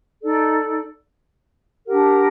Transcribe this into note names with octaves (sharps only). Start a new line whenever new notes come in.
D#4 A4 D5
D4 G4 A#4 F#5